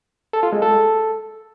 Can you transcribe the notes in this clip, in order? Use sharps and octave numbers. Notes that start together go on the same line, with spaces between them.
A4
F4
G#3
A4